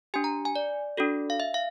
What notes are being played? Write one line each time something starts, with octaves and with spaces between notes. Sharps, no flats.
D4 G4 G#5
A#5
G#5
D5
D4 F#4 A4
F5
E5
F5